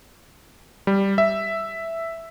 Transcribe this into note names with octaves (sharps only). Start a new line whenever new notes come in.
G3
E5